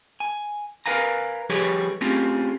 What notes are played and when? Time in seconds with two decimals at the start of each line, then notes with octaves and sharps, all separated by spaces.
0.20 G#5
0.86 A#4 B4 F5 G#5 A#5
1.50 F3 G3 G4 G#4 B4 C#5
2.01 A3 C4 C#4 F4 G4 G#4